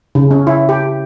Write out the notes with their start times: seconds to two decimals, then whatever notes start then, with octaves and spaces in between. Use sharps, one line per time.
0.15 C#3
0.31 C#4
0.47 E4
0.69 G4